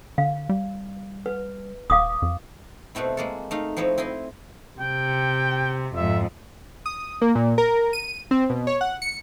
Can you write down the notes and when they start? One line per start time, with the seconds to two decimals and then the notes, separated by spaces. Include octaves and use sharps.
0.18 D3 F5
0.49 G3
1.26 B4
1.90 D#1 F5 D6 D#6
2.22 F2
2.95 B2 A3 C4 E4
3.17 G#3 A#3 A4
3.51 A3 D#4 F5
3.77 F3 C4 E4 C#5 D#5
3.98 C4 E4 D#5 C6
4.80 C3 G5
5.95 F2 G#2 E5
6.86 D#6
7.22 A#3
7.35 A#2
7.58 A#4
7.93 D#7
8.31 C4
8.50 B2
8.67 C#5
8.81 F#5
9.02 C#7